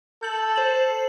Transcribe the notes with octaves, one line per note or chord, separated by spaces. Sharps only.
A4 G6 F#7
C5 F#7